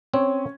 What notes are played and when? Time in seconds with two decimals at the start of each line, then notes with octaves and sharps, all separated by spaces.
0.13 C4 C#4